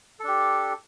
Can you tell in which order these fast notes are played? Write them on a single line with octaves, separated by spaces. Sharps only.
A4 D4 G4